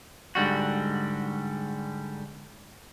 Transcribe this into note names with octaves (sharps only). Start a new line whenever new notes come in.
G#2 D3 G3 F#4